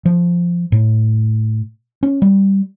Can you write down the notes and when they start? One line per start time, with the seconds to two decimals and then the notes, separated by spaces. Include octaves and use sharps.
0.05 F3
0.72 A2
2.03 C#4
2.22 G3